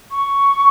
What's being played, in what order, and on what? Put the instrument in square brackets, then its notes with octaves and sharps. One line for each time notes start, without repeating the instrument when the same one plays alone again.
[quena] C#6